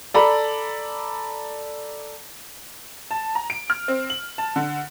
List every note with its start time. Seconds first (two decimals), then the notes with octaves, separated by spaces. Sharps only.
0.14 A4 D5 A#5 B5
3.11 A5
3.35 A#5
3.50 D7
3.70 F6
3.88 C4
4.10 F#7
4.38 A5
4.56 D3